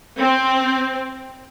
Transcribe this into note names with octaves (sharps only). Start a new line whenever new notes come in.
C4